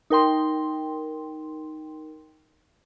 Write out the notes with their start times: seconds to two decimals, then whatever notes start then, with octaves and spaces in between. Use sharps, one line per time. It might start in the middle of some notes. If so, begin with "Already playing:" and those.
0.10 D#4 A#4 G5 C6